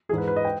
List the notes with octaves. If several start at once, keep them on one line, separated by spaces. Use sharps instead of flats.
G#2 E3 G#4 B4
B4
D#5
G5